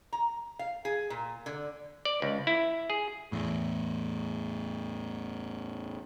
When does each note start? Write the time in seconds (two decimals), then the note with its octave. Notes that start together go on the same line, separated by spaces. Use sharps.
0.13 A#5
0.59 F5
0.85 G#4
1.10 A#2
1.46 D3
2.05 D5
2.22 C#2
2.47 E4
2.90 G#4
3.32 E2 A2